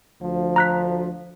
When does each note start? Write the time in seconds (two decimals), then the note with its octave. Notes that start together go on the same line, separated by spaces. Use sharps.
0.21 D2 F3
0.56 A#5 F#6 B6